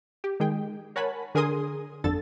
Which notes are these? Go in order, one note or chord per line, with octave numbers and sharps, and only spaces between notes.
G4
D#3 G#3 G#4 G5
A#4 C#5 F#5 G#5 A5 B5
D3 G#4 A#4 G#5 C6 D#6
G1 F2 D3 A4 A6